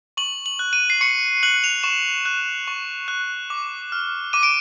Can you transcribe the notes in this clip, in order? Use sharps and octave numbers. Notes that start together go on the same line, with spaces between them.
C#6 F#7
F#7
F#6
D#7
C7
C#6 C#7
F#6 F#7
F7
C#6 E7
F#6
C#6
F#6
D6
F6
D6 D#7
D7